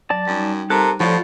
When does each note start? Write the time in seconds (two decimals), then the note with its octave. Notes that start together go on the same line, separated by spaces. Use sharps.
0.10 F#3 D5 A5
0.27 F#2 G3 D#4
0.70 C3 A4 A#4 F#6
1.00 A2 F3 F4 F#4 A4 D5